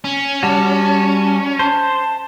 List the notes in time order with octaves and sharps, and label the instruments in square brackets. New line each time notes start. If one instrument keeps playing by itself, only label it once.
[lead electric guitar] C#4
[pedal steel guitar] G3 F#4 [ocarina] A5
[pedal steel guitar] C5 [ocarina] A5